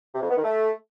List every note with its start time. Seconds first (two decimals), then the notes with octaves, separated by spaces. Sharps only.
0.14 C3
0.22 F2
0.29 B3
0.36 D#3
0.44 A3